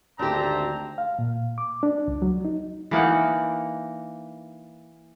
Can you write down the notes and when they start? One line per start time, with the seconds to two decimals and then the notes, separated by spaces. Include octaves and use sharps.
0.19 G#1 D2 C4 D4 G4 A5 A#5
0.98 F5
1.19 A#2
1.58 D6
1.83 D4
2.08 C#2
2.22 F#3
2.45 D#4
2.91 E3 A#3 D#4 F#5